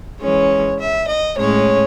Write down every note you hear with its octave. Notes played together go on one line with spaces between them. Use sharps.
E3 G#3 C#4 C#5
E5
D#5
A2 G#3 C#4 C#5